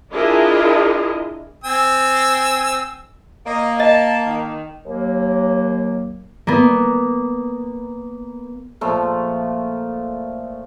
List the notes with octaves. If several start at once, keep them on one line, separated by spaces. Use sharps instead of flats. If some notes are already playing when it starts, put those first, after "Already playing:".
D4 E4 F4 G#4 A#4 D#5
C4 G#5 E6
A#3 D#5
D#5 A5
D#3
D#2 F#3 A#3
A#3 B3
A#2 F3 A3